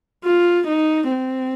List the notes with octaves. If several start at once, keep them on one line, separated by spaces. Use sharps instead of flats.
F4
D#4
C4